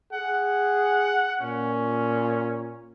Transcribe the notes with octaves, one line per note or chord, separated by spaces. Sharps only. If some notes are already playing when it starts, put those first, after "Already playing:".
G#4 F#5
A#2 C#4